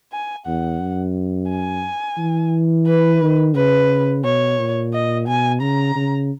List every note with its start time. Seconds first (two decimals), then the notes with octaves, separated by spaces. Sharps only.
0.12 G#5
0.46 E2 F#5
0.80 F#2
1.50 G#5
2.18 E3
2.87 B4
3.22 D#3
3.55 C#3 B4
4.24 B2 C#5
4.59 A#2
4.93 D#5
5.27 B2 G#5
5.61 C#3 A#5
5.96 C#3